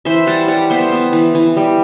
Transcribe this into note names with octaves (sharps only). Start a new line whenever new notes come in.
E3 C5 E5
G3 F#5 A5
G3 D5 F#5
B3 C5 E5
B3
E3
E3
G3